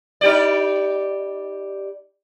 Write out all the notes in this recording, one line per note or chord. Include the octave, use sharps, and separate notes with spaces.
D#4 G4 D5